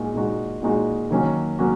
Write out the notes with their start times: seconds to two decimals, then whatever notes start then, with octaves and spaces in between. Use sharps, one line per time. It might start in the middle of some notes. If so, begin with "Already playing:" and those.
Already playing: A#2 G#3 D#4 F#4
0.15 A#2 G#3 D#4 F#4
0.62 A#2 G#3 D#4 F#4
1.10 D#3 F#3 A#3 C#4 F#4
1.59 F#3 A#3 C#4 F#4